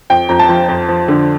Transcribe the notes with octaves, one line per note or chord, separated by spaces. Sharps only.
F2 G5
F2 A#5
A5
F3
F2
F3
D3